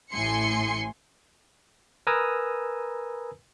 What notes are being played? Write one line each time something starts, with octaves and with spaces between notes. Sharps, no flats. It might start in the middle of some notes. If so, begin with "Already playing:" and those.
A1 A2 G#5 C6 C#7
A#4 B4 G#5 A#5 D#6 E6